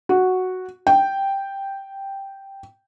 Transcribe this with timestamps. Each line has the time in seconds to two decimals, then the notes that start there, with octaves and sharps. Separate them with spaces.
0.09 F#4
0.87 G5